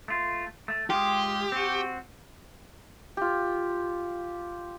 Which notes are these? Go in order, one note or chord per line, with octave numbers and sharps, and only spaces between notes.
A3 F4
A3
G#3 F4 G4
C4 F#4
F4 G4